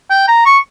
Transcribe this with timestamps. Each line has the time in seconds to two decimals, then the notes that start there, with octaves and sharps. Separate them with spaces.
0.10 G5
0.28 A#5
0.46 C#6